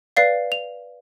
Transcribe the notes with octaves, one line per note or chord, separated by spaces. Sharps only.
B4 D5 F5 C7
F7